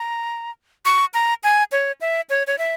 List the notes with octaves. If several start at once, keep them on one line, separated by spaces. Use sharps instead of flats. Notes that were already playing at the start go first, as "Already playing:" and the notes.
Already playing: A#5
C#6
A#5
G#5
C#5
E5
C#5
C#5
E5